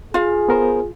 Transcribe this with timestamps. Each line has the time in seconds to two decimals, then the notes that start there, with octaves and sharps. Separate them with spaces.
0.14 F4 G#4 F5
0.49 B3 A#4 C5